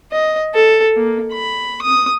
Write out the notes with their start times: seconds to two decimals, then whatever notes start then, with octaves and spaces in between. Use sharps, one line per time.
0.12 D#5
0.54 A4
0.96 A#3
1.33 B5
1.82 D#6